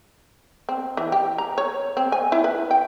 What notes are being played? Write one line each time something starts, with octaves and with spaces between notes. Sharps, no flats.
C4
E3
G4
A#5
C#5
C4
G#5
E4
B4
G5